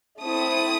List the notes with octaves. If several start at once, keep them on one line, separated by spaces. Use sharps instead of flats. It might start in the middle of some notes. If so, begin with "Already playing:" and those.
A3 C4 E4 D#6